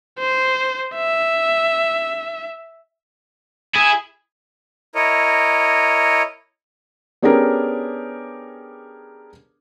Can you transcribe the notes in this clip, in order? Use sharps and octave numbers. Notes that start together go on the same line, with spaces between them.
C5
E5
E4 G#4
E4 A#4 C#5 D#5
B3 C#4 D4 G4 G#4 A#4